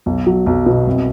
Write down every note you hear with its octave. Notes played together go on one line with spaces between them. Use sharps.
B1
F#3
B1
B2
C2